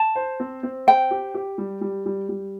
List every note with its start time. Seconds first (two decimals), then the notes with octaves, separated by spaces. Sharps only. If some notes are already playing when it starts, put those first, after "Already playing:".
Already playing: A5
0.16 C5
0.40 C4
0.63 C4
0.87 C5 G5
1.11 G4
1.35 G4
1.58 G3
1.81 G3
2.06 G3
2.29 G3